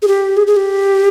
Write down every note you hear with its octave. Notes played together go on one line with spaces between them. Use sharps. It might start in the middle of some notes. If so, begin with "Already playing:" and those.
G#4
G4
G#4
G#4
G4